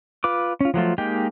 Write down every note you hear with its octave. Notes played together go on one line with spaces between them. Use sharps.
F4 B4 D6
C#4 F4
F3 F#3 A3 F4
G#3 A#3 D#4 G4 G5